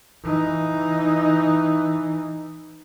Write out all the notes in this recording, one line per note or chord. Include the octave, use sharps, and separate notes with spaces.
E3 D#4